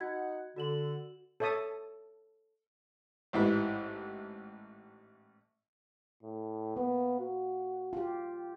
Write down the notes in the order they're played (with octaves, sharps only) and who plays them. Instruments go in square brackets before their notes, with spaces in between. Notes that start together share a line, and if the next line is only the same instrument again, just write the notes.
[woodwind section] D#4 F#5 [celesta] F#4 G#6
[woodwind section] D3 [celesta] F#4 E7 F#7
[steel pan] A4 C#5 E5 A5 D#6
[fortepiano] A1 G#2 E4 B4
[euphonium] A2
[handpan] A#3 [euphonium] B3
[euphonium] F#4
[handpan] F4 G4